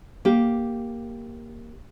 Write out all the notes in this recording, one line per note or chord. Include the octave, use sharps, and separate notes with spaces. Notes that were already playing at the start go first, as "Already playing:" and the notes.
A#3 G4